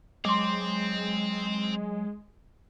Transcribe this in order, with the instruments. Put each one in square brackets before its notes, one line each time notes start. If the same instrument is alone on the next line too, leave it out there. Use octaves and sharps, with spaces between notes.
[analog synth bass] F#3 [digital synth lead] G#3 [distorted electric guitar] C4 [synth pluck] C6 D6